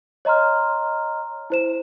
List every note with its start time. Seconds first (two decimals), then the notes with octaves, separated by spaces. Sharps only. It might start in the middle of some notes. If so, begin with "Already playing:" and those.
0.25 C#5 D#5 A#5 C6 F6
1.50 E4 C5 E7